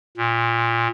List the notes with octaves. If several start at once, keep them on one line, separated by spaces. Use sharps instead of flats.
A#2